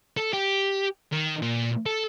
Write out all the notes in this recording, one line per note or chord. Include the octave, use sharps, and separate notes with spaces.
A4
G4
D#3
A#2
A4